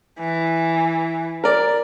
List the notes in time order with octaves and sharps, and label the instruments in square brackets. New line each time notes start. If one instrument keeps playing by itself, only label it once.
[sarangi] E3
[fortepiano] A#4 D5